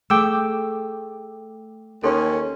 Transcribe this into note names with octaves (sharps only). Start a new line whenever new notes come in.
A3 G#4 A4 G5 D6 E6
D#2 C#4 A4 C6